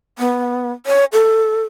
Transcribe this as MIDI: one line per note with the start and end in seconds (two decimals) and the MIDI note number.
0.19 0.71 59
0.86 1.05 73
1.13 1.63 69